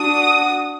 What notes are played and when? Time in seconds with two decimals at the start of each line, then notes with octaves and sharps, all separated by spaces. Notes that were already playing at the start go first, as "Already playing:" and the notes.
Already playing: D4 F#4 D#6